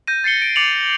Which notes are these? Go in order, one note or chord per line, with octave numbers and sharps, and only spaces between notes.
G6 A#6 D#7
A6 C7 C#7 G7
D7
D6 A6 C#7 F7 F#7